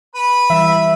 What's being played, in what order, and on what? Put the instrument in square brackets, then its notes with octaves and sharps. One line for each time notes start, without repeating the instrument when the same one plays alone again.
[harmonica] B4 B5
[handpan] E3 G3 [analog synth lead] E5